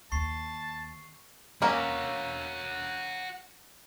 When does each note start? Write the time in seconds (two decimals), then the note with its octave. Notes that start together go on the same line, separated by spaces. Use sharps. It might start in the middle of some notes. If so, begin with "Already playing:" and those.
0.12 D#2 A5 C#6 C7
1.62 A#3 C#4 F#4 E5